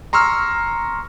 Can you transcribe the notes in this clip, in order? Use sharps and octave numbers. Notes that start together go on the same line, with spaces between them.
A#5 C6 C#6 E6 F6